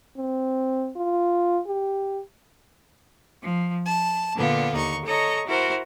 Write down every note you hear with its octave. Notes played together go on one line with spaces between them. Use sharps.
C4
F4
G4
F3
A5
A#2 D3 B3 F4
D#2 D#4 C#6
A4 C#5 D#5 A#5 C#6
E4 F#4 A#4 C5